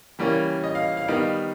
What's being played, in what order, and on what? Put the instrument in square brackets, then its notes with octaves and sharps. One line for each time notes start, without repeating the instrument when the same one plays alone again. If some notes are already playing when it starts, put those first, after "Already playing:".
[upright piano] E3 G3 A#3 C#4
D#5
F5
F5
D#3 G3 B3 D#4 F5